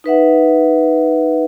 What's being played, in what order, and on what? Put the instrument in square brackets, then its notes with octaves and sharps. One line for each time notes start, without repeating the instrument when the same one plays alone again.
[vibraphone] D#4 B4 E5 F#5